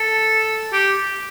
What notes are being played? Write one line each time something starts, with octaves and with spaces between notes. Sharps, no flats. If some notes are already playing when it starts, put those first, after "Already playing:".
Already playing: A4
G4